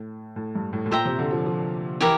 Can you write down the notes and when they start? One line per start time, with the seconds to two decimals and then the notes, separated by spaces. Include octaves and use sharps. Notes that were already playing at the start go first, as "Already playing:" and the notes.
Already playing: A2
0.36 A2
0.55 G2
0.73 A2
0.86 A2
0.91 A#2 C5 E5 G5 A#5
1.05 C3
1.19 D3
1.32 F3
1.46 F3
2.01 E3 E4 G4 A#4